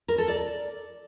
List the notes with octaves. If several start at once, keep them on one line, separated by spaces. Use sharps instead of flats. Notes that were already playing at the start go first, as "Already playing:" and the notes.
A#4
A4
D5